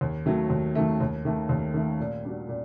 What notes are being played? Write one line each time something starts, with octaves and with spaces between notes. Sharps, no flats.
D#2
D#3 F#3 A3
D#2
D#3 F#3 A3
D#2
D#3 A3
D#2
D#3 A3
A#2
G3 D4 F#4
A#2